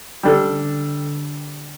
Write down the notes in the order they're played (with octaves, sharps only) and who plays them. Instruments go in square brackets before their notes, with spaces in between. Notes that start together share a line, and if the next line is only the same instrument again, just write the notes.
[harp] D3 [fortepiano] G3 D4 A4